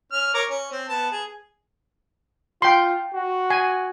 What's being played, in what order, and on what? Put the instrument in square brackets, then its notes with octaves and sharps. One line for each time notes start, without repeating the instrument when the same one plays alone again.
[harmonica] C#4 F6
A#4 C#5 D6
C#4
C4
B3 A5
G#4
[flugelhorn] F4 [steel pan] G5 C6
[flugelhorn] F#4
[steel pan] G#5